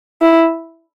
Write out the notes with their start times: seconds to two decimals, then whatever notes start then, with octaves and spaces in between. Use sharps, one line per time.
0.22 E4